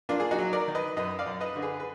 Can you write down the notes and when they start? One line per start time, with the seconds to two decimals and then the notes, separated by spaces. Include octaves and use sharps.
0.09 A#3 D4 F4
0.20 G#4
0.31 D#4 F#4
0.39 F#3
0.53 A#4 D5
0.68 D#3
0.75 B4 D#5
0.97 F#2 B4 D#5
1.19 D5 F5
1.26 F#2
1.41 B4 D#5
1.56 D3
1.62 G#4 B4
1.80 B4